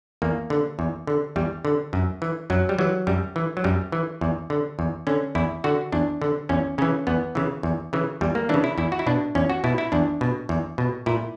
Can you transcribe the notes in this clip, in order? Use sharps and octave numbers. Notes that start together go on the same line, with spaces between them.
E2 A#3
D3
E2
D3
E2 G3
D3
F#2
E3
F#2 F#3
G3
E3 F#3
F#2 G3
E3
F#3
F#2 G3
E3
E2
D3
E2
D3 C#4
E2 E4
D3 F#4
E2 D4
D3
E2 C#4
C#3 E3 C#4
E2 B3
C#3 E3
E2
C#3 E3
E2 G3
A#3
C#3 E3 D4
E4
E2 E4
F#4
E4
B2 D4
E2 C#4
F#4
B2 E4
E4
E2 D4
B2
E2
B2
A#2 E4